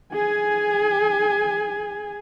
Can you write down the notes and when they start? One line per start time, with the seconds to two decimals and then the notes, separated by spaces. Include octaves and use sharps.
0.14 G#4 G#5